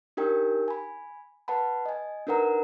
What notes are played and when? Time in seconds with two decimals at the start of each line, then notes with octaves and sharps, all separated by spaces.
0.17 D4 D#4 G4 A#4 G5
0.68 G#5 B5
1.48 B4 F#5 A5 B5
1.85 D#5 G#5
2.27 D4 D#4 A#4 B4 F#5 A#5